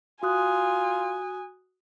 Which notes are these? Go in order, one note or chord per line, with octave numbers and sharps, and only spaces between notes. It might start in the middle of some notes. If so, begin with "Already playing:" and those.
F4 F#4 G#5 D#6 F#6